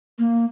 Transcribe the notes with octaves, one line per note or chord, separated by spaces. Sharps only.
A#3